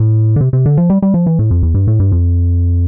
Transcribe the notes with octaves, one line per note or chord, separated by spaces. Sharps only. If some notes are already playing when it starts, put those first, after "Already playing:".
Already playing: A2
D3
C3
C3
D3
F3
G3
G3
F3
E3
A2
F2
E2
G2
A2
G2
F2